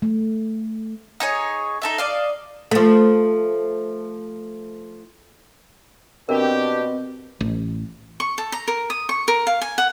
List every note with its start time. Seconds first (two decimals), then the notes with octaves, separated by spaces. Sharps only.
0.02 A3
1.20 D#4 G#4 C#5
1.82 D#4 A4 E5
1.98 D5 D#5 F5
2.71 F3 A3
6.29 B2 C4 D4 G4 A#4
7.41 A1
8.20 C#6
8.38 A4
8.52 A#5
8.68 A#4
8.90 D#6
9.09 C#6
9.28 A#4
9.47 F5
9.61 G#5
9.78 F#5